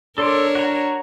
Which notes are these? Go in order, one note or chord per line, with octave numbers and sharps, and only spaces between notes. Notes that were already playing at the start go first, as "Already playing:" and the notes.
D4 A4 A#4 C#5 C6 D6
F#4 A#5